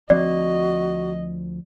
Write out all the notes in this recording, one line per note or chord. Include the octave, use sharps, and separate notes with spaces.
D2 F3 C4 F#4 D5 D#5